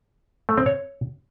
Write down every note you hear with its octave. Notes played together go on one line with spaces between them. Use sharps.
A3
C4
C#5